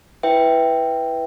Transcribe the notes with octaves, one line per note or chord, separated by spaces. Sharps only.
E4 B4 E5 G5